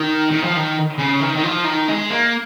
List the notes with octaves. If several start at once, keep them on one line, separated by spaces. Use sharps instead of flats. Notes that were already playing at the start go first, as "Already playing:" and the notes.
Already playing: D#3
D#3
F3
D#3
C#3
D#3
D#3
F3
D#3
G#3
A#3